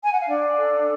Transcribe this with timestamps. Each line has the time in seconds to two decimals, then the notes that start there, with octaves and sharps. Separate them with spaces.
0.03 G#5
0.11 F#5
0.20 F5
0.28 D4 D5
0.57 A4